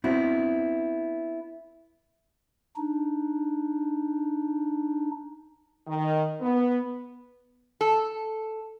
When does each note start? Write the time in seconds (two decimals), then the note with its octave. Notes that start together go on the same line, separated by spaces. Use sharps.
0.04 B3 C4 D4 E4 F#4
2.76 D4 D#4
5.87 D#3
6.41 B3
7.81 A4